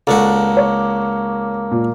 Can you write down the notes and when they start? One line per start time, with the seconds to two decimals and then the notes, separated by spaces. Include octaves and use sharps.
0.07 C#2 A#3 D4 F#4 A4
0.57 C#5
1.71 A#2